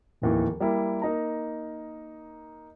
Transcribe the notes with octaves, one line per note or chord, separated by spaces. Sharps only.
D1 D#2 E3
G3 A#3 E4
A#3 D#4 A#5